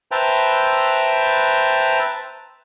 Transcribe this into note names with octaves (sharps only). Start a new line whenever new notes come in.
B4 C5 E5 G5 A5 A#5